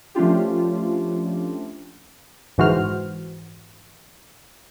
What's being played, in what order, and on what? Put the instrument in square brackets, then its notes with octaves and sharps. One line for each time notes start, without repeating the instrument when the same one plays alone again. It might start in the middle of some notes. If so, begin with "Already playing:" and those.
[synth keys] F3 A3 C#4 D4 F4 G4
[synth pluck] G#2 E3 F#4 C5 F6